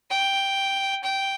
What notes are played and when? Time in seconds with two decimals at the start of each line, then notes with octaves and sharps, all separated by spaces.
0.10 G5
1.03 G5